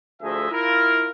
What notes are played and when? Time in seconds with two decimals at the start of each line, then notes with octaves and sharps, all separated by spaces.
0.22 D2 F3 A3 G#4 D#5 E5
0.51 E4 F4 A#4